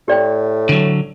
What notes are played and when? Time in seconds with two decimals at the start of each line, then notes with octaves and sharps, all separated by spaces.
0.08 A2 G4 D5 G5
0.69 D3 F#3